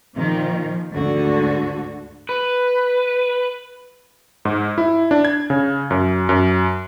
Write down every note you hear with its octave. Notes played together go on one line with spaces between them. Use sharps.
A#2 D#3 F3
D2 G#2 D3 F#4
B4
G#2
E4
D4
G#6
C#3
F#2
F#2